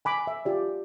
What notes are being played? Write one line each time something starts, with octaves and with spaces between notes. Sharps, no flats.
G#5 B5 D6
E5
F4 G4 D5